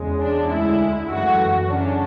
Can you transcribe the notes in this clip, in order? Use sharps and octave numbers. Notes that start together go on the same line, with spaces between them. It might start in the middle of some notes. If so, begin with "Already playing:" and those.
Already playing: E2 C#3 G#3
D4
D2 D3 G#3 E4
F#2 E3 A3 F#4
C#3 F#3 C#4 D4